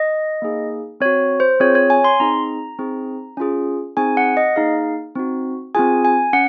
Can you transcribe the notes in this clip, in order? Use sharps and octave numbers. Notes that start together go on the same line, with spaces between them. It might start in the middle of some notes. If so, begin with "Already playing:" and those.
Already playing: D#5
A#3 D#4 G#4
C4 F#4 C#5
C5
C4 F4 G#4 C#5
C#5
G#5
C6
C4 D#4 G#4 A#5
C4 D#4 G#4
C#4 F4 G#4
C4 D#4 G#4 G#5
F#5
D#5
A#3 D#4 G#4 F5
C4 D#4 F#4
C4 F4 G#4 G#5
G#5
C#4 F#5